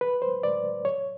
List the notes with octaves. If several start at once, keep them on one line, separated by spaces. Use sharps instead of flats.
B4
C5
D5
C#5